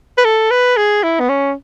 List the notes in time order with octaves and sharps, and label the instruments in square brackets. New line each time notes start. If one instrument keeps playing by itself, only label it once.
[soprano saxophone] B4
A4
B4
G#4
E4
B3
C#4